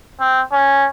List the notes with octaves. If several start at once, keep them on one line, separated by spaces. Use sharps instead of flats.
C4
C#4